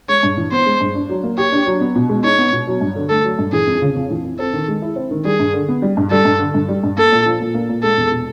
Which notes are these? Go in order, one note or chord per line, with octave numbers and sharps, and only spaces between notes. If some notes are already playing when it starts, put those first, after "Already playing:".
G#3 C#5
G2
E3
B3 C5
G#3
G2
D4
F#3
A#3
G4 C#5
D4
F#3
B3
B2
G#3
D#4 C#5
B3
B2
F#3
G2
D3
A3 A4
F#3
G2
E3 G#4
F2
C#3
F2
E3
F2
C4 A4
D#3
G#3
E4
C4
D#3
G3 G#4
G2
D3
B3
G3
G2
G3 A4
G2
D3
G2
G3
G2
A#3 A4
A#2
F3
A#2
A#3
A#2
G#3 A4
E2
B2